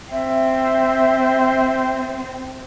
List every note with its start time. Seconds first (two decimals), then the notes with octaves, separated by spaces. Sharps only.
0.12 C4 E5